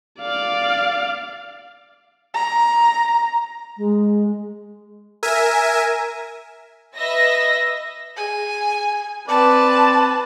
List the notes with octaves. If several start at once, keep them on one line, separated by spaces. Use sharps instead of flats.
D5 F5
A#5
G#3
A#4 E5 G#5
B4 D#5 E5 A#6
G#4 G#5
C4 B4 D5 A5